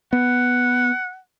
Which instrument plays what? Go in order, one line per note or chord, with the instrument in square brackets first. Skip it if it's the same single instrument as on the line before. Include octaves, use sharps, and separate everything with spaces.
[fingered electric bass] B3 [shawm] F#5